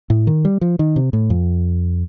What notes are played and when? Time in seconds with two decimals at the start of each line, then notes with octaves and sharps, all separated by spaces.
0.10 A2
0.27 D#3
0.45 G3
0.61 F3
0.79 D#3
0.96 C3
1.13 A2
1.30 F2